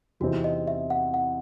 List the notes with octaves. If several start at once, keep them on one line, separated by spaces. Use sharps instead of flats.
E2 C3 E3 C4 D#4 F#4
D#5
E5
F#5
F#5